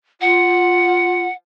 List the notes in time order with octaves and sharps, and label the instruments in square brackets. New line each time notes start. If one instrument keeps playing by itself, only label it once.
[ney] F4 [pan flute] F#5